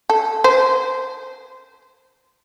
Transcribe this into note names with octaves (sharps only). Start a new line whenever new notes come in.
A4
C5